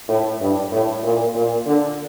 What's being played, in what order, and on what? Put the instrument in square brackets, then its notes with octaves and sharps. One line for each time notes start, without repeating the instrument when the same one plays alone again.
[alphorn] A2
G2
A2
A#2
A#2
D3